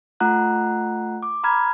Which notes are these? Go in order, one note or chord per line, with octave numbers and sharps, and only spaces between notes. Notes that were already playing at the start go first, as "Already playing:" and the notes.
A3 F4 F#5 A#5 F#6
D6
A#5 B5 F6 G#6